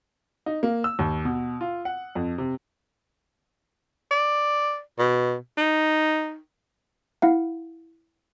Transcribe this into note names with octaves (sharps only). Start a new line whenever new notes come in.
D#4
A#3
E6
D#2
B2
F4
F#5
F2
C3
D5
B2
D#4
E4 F5 F#5